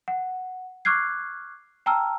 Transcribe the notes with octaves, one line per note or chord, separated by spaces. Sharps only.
F#5
C#6 D6 F6 F#6 G#6 C7
G5 A5 A#5 E6 F6